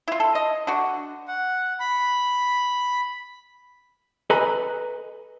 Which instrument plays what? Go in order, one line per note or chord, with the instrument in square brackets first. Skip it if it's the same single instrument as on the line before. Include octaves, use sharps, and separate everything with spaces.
[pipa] E4 F4
A4
D#5
D3 F#4
[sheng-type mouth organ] F#5
B5
[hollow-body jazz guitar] A4 B4 D#5 G#5 A#5 B5